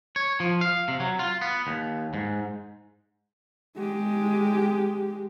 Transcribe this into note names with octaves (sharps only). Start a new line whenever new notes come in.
C#5
F3
F5
C3
F#3
F4
B3
D#2
G#2
G#3 G4